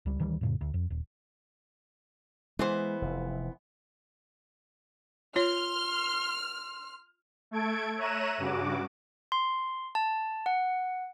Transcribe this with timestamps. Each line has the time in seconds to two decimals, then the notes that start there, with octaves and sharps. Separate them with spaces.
0.06 C#2 G3
0.19 D2 D#3 E3 G3
0.41 F2 A2 C#3
0.61 D2
0.74 F2
0.90 D#1
2.59 E3 G#3 B3 C5
3.02 F1
5.36 F4 C#5 C6 F6
7.51 A3 A4 G#6 D7
7.96 C#5 E5 A#5 F#6 D#7 E7
8.38 G2 C#3 F#4 D6
9.32 C6
9.95 A5
10.46 F#5